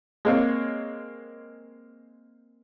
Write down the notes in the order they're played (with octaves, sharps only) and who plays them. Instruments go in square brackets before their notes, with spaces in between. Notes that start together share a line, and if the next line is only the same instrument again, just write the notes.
[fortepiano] G#3 A#3 C4 C#5